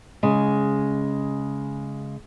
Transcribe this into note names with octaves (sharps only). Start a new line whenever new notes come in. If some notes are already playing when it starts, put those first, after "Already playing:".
C#3 G#3